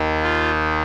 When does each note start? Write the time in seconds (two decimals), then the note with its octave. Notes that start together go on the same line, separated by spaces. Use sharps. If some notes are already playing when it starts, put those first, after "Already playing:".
Already playing: D#2 D#3
0.22 F4